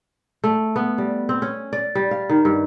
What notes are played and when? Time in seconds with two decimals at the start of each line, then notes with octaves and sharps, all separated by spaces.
0.44 A3
0.76 B3
0.98 G3
1.29 C4
1.42 C#4
1.73 D5
1.95 G3
2.11 F5
2.29 D#3
2.45 G2